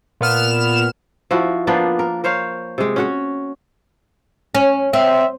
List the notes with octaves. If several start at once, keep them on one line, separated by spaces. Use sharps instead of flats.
A#2 B3 F6 E7
F3 E4 F#4
F3 A#3 B3 D4
A#4
A#4 C5 C#5 F5
C3 G#3
C#4 F#4 C#5
C#4
C4 E5